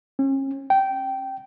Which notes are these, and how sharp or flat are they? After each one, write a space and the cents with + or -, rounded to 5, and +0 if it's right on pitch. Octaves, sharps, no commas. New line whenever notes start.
C#4 -40
G5 -15